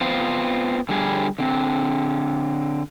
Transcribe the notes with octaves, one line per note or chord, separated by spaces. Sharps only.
B3 C4 F4 C5
D3 G3 G#4
D3 C4